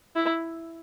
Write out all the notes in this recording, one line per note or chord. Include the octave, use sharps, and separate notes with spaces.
E4